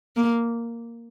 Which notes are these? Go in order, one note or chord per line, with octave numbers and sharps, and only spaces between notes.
A#3